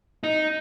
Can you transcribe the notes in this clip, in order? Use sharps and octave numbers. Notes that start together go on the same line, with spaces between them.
D#4